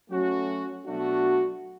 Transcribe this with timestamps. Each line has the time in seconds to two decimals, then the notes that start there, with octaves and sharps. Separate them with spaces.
0.10 F#3 A3 C#4 F#4
0.86 B2 F#3 A3 D4 F#4